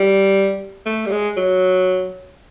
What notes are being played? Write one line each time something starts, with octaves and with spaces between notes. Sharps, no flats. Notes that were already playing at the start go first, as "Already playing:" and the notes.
Already playing: G3
A3
G3
G#3
F#3